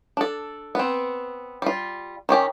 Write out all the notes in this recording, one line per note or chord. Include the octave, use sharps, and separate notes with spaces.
D4 A4
B3 C4
G3 F4
D#3 C#4 G4 A#5